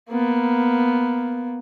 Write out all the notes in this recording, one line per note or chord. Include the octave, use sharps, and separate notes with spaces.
A#3 B3